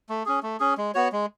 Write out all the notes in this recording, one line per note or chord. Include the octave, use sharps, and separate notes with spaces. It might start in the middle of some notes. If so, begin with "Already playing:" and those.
A3
C#4 G#4
A3
C#4 G#4
G#3
B3 F#4 C#5
G#3